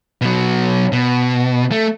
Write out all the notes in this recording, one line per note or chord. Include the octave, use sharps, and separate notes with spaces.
B2 F#3
B2
A3